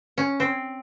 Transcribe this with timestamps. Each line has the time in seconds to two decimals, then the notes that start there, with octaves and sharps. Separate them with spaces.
0.18 C#4
0.40 C4